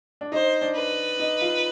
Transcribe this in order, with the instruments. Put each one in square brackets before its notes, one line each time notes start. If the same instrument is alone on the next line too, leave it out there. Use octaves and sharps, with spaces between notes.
[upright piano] D4
[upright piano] D#4 [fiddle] C5
[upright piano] D4
[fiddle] B4
[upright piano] D#4
F4